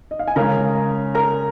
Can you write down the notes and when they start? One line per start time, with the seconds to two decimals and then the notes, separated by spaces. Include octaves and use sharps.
0.11 D#5
0.19 F5
0.28 G#5
0.36 C#3 G#3 C#4 A#4 A#5
1.15 A#4 A#5